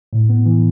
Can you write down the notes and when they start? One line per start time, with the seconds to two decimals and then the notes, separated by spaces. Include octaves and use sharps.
0.13 A2
0.29 B3
0.46 E3